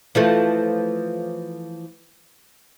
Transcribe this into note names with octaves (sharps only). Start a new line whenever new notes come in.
E3 F3 A3